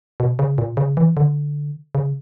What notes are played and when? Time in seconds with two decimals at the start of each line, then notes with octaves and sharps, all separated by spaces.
0.20 B2
0.39 C#3
0.58 A#2
0.77 C#3
0.97 E3
1.17 D3
1.95 C#3